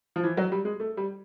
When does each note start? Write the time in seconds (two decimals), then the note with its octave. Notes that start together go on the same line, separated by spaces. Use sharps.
0.16 F3
0.23 E3
0.37 F#3
0.52 G3
0.65 G#3
0.80 A3
0.97 G3